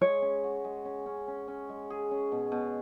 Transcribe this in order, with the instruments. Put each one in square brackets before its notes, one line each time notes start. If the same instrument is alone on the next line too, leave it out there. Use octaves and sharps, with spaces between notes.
[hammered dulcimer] G#3 [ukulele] C#5
[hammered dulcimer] C#4
F#4
G#3
C#4
C#4
C#4
C#4
G#3
G#4
C#4
B2
B2